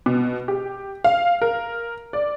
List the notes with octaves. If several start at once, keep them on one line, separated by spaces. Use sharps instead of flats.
B2
G4
F5
A#4
D5